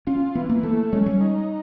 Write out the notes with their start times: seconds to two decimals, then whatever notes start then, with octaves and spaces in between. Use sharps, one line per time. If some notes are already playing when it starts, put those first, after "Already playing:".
0.07 C#4 F4
0.35 E3 B3
0.49 A#3
0.63 A3 A#3
0.92 G#3 C#4
1.06 G3
1.21 D#4